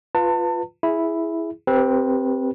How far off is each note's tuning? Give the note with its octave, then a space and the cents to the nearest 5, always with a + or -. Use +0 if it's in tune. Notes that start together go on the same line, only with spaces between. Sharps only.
F4 +0 B4 +0 A5 +35
E4 +0 G#4 +0
C4 +0 G4 +0 B4 -30